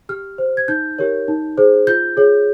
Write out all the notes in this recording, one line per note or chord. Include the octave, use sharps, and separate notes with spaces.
G4 F6
C5
G#6
D#4 G6
G4 A#4 C#5
D#4
G#4 C5
F4 G6
G#4 C#5